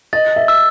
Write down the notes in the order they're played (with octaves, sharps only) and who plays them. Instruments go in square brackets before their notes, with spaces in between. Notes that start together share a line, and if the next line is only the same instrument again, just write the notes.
[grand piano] D#5 [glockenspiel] A6
[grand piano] E5
[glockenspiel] E6